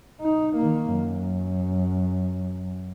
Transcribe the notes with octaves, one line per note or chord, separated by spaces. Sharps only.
D#4
D#3 A#3
F#2